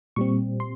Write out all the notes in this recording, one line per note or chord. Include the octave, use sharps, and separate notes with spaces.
A#2 G3 C4 C#6
C6